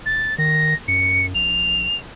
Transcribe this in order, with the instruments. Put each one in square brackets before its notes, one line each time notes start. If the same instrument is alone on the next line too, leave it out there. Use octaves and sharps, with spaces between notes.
[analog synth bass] E1 [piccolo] A6
[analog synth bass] D#3 [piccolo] A#6
[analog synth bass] F#2 [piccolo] C#7
[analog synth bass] A#1 [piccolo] F7